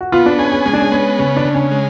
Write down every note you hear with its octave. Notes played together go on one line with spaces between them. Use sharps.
F#4
B3 F4
D4
C#4 G#4
C#4
G#3 C#4
D4
C#4
B3 C#4
C#3 C#4
D4
C#3
C#4
G#3